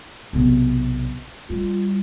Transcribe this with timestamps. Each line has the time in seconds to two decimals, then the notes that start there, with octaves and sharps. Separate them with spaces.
0.33 B1 C3
1.50 G3 F4